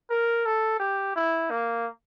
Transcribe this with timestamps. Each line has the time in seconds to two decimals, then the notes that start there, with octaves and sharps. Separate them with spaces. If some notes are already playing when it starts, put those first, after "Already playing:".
0.10 A#4
0.46 A4
0.80 G4
1.16 E4
1.51 A#3